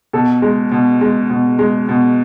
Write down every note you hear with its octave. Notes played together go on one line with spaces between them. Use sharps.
B2 A4
G#3
B2
G#3
B2
G#3
B2